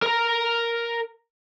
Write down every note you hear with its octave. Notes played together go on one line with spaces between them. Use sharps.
A#4 A#5